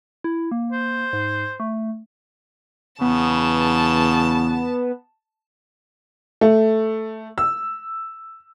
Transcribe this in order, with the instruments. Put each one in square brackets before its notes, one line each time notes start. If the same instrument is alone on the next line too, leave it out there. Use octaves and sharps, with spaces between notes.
[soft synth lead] E4
A#3
[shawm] C5
[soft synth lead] G#2
A3
[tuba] E2 [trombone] C#3 [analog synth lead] B3 [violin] A5
[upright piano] A3
E6